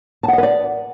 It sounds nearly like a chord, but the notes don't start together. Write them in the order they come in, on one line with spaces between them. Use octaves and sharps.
A5 F#5 D#5 B4 D5